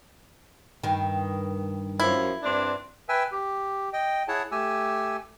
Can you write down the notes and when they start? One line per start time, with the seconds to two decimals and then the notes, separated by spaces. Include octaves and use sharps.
0.83 G2 D#3
2.00 F#2 F3 E4
2.43 G2 C4 D4
3.09 B4 E5 G5 G#5 E6
3.32 G4
3.93 D#5 G5
4.28 E4 G#4 C#5 F#5 A5
4.51 A3 G4 G#5 E6